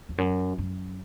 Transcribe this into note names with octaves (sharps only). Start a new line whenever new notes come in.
E2
F#2
F#2